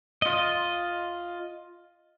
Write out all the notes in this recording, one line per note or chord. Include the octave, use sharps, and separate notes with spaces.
F4 D#5